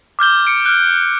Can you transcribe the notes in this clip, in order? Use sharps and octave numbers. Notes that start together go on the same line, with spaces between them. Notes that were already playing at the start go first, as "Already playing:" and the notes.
D6 F6 G6 G7
C#7 D7
F6 F#6